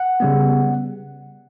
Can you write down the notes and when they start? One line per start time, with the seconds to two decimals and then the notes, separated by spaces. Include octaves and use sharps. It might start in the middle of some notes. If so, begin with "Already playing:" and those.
Already playing: F#5
0.20 C#3 G3 B3